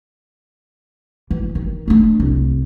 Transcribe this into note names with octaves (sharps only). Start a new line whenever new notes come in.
E3
D#3
A3 D4
C2